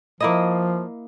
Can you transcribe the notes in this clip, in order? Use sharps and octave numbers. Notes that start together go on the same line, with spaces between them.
F3 A#3 E4 D#5